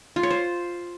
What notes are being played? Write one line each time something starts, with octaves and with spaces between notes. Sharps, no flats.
F4
C#5
C5